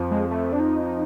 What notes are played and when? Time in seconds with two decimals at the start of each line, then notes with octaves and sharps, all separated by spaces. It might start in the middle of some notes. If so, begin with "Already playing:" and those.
Already playing: F2 F3
0.11 G#3
0.31 A3
0.52 D4
0.60 D#4